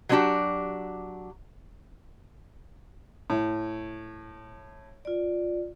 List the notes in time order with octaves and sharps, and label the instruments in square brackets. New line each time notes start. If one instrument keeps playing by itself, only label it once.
[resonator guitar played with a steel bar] F#3 G#3 C#4 D4 F#4 G4
[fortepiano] A2
[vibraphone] F4 D5